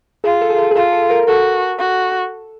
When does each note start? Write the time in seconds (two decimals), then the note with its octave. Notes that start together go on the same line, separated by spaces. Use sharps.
0.24 F4 G#4
0.41 A4
0.50 G#4
0.58 A4
0.71 G#4
0.75 F4 A4
0.93 A4
1.10 A#4
1.27 F#4 A4
1.79 F#4